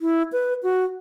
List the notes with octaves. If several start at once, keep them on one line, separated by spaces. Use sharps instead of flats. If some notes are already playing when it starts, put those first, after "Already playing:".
E4
B4
F#4